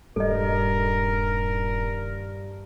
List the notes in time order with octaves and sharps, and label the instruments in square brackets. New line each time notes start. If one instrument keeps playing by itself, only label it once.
[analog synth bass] D#1 [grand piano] G2 [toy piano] A4 D#5 [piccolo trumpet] A#4